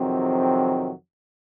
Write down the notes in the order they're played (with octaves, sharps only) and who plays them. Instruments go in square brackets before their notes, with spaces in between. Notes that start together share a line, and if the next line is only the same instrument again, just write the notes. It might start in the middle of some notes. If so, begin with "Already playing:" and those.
Already playing: [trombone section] F2 C3 D#3 F#3 C4